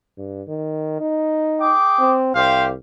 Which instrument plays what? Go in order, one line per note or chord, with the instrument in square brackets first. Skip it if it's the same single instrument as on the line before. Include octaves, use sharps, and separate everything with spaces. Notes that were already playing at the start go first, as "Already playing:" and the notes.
[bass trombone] G2
D#3
D#4
[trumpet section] G#4 G5 D6
[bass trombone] C4
[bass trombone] C2 [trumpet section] G4 C5 F5